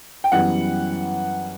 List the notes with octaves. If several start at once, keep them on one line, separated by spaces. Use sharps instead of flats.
G5
F#2 E3 G3 B3 F#5